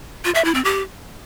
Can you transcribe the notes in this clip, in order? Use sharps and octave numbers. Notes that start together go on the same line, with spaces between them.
F4
E5
E4
C4
G4